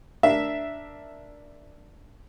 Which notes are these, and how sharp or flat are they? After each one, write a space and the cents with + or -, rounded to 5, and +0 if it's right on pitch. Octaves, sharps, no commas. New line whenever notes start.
D4 +0 A#4 +5 E5 +0